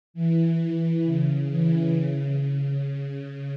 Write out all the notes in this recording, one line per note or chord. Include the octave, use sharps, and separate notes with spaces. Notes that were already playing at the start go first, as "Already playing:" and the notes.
E3
E3
C#3
E3
C#3
C#3